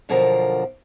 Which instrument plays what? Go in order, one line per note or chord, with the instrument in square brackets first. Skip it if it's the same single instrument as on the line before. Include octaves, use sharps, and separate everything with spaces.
[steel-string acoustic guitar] F#2 B2 D3 F3 A#4